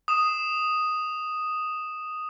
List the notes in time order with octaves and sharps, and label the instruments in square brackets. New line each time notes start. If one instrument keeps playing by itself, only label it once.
[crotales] D#6 E7